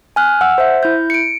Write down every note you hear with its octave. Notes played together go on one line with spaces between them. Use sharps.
G#5 F6 F#6
F#5 E6
C5 E5
E4 G6
C#7 D7